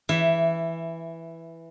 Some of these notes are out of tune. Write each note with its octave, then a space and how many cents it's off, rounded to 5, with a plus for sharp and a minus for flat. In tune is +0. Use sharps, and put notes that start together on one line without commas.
E3 +0 E5 +15